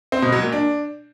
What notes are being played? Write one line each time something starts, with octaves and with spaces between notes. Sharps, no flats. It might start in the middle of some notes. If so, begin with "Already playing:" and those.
C4
B2
F#3
A#2
D4